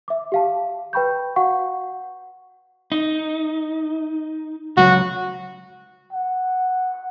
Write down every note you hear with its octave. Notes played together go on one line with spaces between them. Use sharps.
E5 D6
G4 F5 A5
B4 G5 B5 C#6 G6
F#4 F5 F#5 C#6
D#4
C#2 F#3 F#4
F#5